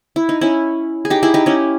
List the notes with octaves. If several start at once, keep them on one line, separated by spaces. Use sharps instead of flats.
E4
D#4
C#4 E4
G#4
D#4 G4
E4 G#4
D#4 G4
C#4 E4